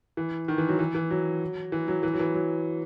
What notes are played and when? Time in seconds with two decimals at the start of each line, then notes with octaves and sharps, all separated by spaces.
0.17 E3
0.48 D#3
0.58 E3
0.69 F#3
0.79 E3
0.95 E3
1.11 F#3
1.72 E3
1.88 F#3
2.03 E3
2.13 F#3
2.19 E3
2.34 F#3